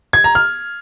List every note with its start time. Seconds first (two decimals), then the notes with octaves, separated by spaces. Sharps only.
0.13 G#6
0.24 A#5
0.35 F6